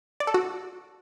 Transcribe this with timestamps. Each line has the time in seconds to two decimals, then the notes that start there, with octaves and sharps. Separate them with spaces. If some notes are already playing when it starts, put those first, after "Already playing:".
0.20 D5
0.27 A4
0.34 F#4